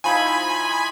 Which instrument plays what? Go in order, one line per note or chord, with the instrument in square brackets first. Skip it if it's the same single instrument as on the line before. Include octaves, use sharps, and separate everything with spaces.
[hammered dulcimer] F3 D#4 E4 [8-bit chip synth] G#5 B5